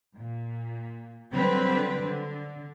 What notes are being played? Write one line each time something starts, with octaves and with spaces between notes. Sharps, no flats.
A#2
D3 F#3 G3 C4 B4
D3